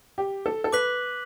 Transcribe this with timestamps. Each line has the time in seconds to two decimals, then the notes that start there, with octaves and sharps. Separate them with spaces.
0.18 G4
0.46 A4
0.64 A4
0.73 B4 D6 F#6 B6 F#7